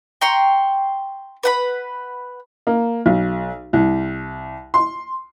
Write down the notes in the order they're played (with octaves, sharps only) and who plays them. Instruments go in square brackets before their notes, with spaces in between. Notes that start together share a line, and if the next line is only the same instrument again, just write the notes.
[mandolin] G5 A#5 C6 C#6
B4 F#5 B5
[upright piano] A#3
B1
C2
C6